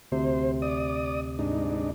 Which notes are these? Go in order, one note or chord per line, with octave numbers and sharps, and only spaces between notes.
D2 C3 C5
D5 D#6
G#2 D4 D#4